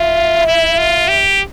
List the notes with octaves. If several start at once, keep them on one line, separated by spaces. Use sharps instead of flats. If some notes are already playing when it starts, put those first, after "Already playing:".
Already playing: F4 E5
E4
F4
G4